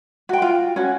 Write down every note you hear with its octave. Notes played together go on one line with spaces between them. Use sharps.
F#4 G5
F4
C#4 F#4